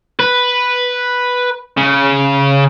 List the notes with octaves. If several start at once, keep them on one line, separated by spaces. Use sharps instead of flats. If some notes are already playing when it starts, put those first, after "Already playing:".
B4
C#3